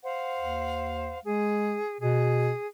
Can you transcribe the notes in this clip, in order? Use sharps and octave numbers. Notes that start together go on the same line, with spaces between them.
C5 F5 F#5
D#2
G#3 G#4
B2 G#4